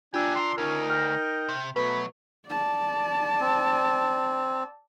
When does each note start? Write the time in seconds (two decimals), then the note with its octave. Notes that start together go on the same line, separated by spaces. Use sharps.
0.14 A#3 D4 F4 G4 G#5 E6
0.36 D#3 A#4 C6
0.58 D2 C#4 D#4 A#4
0.90 G5 F6 A#6
1.49 C3
1.76 B2 F#3 A3 B4 B5
2.47 D5 A5
3.40 C4